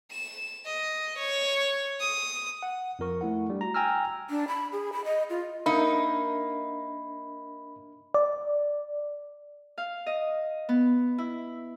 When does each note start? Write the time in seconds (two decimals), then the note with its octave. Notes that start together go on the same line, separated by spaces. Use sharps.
0.11 E7
0.66 D#5
1.18 C#5
2.00 D#6
2.63 F#5
2.99 F2 F3 A#4 C#6
3.21 A3 E4 F#5
3.50 G3 D4
3.61 F#4 A#5
3.74 G5 G#5 A#5 E6 F6
4.30 D4
4.48 B5
4.72 G#4
4.93 B5
5.05 D#5
5.30 F4
5.66 A#3 D4 D#4 A#4 E5 B5
8.14 D5
9.78 F5
10.06 D#5
10.69 B3
11.18 E4